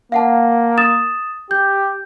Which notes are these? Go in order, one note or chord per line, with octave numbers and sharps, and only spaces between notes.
A#3 F5 F#5 A5
D#6 A6 E7
G4 G6